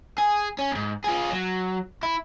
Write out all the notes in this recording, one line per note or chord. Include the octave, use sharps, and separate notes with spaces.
G#4
C#4
D2 G#2
F4 G#4
F#3
E4